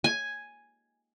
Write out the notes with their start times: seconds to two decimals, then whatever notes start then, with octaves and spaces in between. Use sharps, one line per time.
0.04 G#5